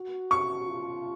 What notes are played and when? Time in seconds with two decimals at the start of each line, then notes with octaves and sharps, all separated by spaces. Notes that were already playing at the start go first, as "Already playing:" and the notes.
Already playing: F#4
0.31 C#6
0.69 F4